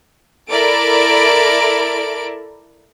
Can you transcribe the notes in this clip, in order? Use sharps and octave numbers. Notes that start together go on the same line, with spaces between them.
E4 A4 A#4 D5 D7